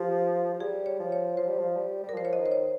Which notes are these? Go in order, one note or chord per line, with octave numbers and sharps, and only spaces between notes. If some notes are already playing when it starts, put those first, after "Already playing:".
Already playing: F3 G4
F3
G3 G#4
C#5
F3
C#5
F3 C5
G3
F3
G3
G3
A#4
F3 C5
C#5
D#5
D#3
C5
C#5